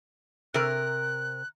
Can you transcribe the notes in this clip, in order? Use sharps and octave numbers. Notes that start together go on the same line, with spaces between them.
C3 A#4 F#6